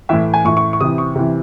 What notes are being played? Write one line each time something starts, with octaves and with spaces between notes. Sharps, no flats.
A2 E3 E5
G#5
A2 E3 C#6
C#6
C#6
C3 E3 D#6
C#6
C3 E3